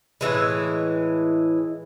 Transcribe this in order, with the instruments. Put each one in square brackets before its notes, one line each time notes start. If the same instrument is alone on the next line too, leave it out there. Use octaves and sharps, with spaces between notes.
[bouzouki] A2 D#3 E3 G#3